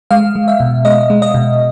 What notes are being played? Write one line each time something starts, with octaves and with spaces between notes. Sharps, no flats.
G#3 F5
G#3
E5
B2
G#3 D#5
G#3
D#5
B2